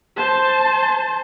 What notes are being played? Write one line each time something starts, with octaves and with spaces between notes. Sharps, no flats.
C5 A5